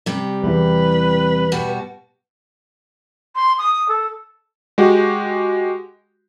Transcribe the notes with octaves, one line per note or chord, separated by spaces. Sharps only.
C3 G3
E2 E3 B4
B2 G3 F#4
C6
D#6
A4
G#3 F#4 G4